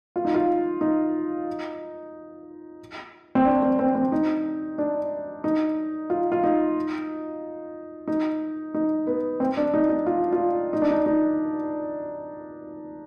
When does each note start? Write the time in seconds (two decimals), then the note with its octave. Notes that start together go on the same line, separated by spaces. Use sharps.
0.16 F4
0.25 D#4
0.34 F4
0.81 D#4
3.35 C4
3.45 D4
3.62 C4
3.79 C4
3.95 C4
4.12 D#4
4.78 D4
5.44 D#4
6.10 F4
6.32 F4
6.44 D#4
8.08 D#4
8.74 D#4
9.07 B3
9.40 C4
9.57 D4
9.74 D#4
9.89 D#4
10.07 F4
10.32 F4
10.73 D#4
10.82 D4
10.91 D#4
11.06 D#4